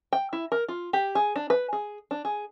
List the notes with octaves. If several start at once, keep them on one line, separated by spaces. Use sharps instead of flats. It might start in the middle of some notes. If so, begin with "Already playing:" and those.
G5
E4
A#4
F4
G4
G#4
D4
B4
G#4
D4
G#4